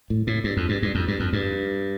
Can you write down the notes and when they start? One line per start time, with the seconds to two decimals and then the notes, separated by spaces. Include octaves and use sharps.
0.10 A2
0.27 A2
0.44 G2
0.57 F2
0.69 G2
0.82 G2
0.95 F2
1.08 G2
1.20 F2
1.33 G2